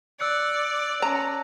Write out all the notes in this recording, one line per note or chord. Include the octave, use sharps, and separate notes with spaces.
D5 E6 F#6 C#7
C#4 A5 A#5 A#6